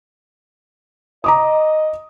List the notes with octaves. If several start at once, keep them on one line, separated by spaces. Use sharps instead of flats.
D#5 A#5 D6 D#6